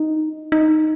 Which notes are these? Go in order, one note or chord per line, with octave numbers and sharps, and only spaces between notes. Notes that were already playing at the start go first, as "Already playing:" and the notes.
Already playing: D#4
D#4